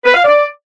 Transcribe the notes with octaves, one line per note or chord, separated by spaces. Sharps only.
B4
F5
D5